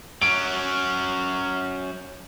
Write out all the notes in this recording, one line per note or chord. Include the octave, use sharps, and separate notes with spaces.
F#3 C#4 D7